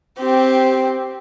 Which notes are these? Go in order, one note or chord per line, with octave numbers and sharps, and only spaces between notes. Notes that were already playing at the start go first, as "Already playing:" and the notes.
C4 G4